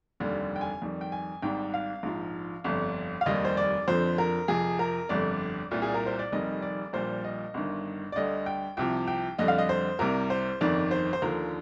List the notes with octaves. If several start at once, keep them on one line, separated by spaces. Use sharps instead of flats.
F1 D#2 D3 G3
G5
G#5
F2 D#3 G3
G5
G#5
G#1 G#2 G3 G5
F5
A#1 G#2 F3
G1 F2 D3 G3
F5
F1 D#2 D#3 G3 D#5
C5
D5
F2 D3 F3 C5
A#4
F2 C3 F3 G#4
A#4
G1 F2 D3 G3 D5
C2 A#2 G3
G#4
A#4
C5
D5
F1 F2 D#3 G3 D#5
D5
A#1 A#2 G3 C5
D#5
G1 G2 D#3
D5
D2 D3 G3 D#5
G5
C2 C3 F3 G5
G5
F2 D3 G3 D#5
F5
D#5
C5
C2 C3 G3 A#4
C5
G1 F2 D#3 D5
C5
C5
D#2 D3 F3 A#4